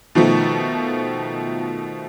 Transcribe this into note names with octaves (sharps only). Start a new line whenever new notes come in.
B2 D#3 F3 A3